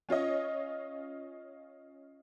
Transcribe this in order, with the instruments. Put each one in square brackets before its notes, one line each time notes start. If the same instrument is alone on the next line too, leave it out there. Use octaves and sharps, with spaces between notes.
[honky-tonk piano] C#4 F4 C#5 D#5